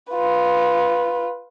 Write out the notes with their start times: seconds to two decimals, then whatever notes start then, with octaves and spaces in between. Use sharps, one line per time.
0.11 F4 B4